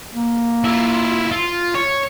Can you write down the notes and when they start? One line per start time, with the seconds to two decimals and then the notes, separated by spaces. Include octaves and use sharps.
0.13 A#3
0.64 E4 F4
1.32 F4
1.75 C#5